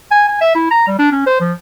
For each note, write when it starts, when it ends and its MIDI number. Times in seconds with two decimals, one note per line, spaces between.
0.11 0.24 80
0.28 0.37 80
0.41 0.52 76
0.55 0.67 64
0.71 0.85 82
0.87 0.97 55
0.99 1.07 62
1.12 1.25 61
1.27 1.40 72
1.41 1.53 53